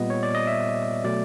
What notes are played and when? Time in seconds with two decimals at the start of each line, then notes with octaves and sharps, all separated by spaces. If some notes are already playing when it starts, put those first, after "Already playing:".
Already playing: A#2 G3 B3 D#5
0.10 C#5
0.23 D5
0.35 D#5
0.47 E5
1.04 B2 F#3 A3 D5